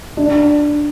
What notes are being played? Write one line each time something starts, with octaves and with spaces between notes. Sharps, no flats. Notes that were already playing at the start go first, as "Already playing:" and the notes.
D4